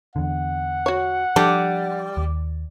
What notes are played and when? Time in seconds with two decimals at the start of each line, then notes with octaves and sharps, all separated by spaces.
0.16 E2 D3 F#5
0.86 F#4 C#5
1.36 F3 G3 D4 A4
2.17 D#2